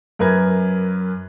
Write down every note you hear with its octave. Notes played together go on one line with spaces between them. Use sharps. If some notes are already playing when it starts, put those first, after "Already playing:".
F#2 A#4 B4 G#6